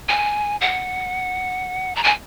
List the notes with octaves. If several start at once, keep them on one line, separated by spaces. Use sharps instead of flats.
G#5
F#5
A#5
G#5